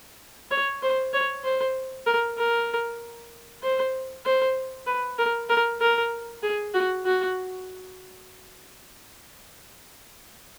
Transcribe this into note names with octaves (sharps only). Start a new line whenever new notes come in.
C#5
C5
C#5
C5
A#4
A#4
C5
C5
B4
A#4
A#4
A#4
G#4
F#4
F#4